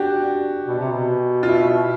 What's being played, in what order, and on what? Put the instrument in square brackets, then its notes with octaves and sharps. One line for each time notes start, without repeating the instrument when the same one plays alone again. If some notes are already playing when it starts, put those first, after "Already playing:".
Already playing: [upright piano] D4 F#4 G4
[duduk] B2
C3
B2
[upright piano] F4
E4